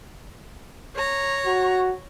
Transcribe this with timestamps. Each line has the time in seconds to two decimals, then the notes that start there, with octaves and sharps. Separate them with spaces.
0.96 C#5 A#5
1.46 F#4